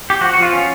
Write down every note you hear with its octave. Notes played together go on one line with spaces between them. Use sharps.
G4
F3 F#4
F3 F#4
F4
C#4